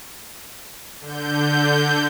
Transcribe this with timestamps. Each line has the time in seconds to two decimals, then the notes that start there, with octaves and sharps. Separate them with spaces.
1.00 D3 G6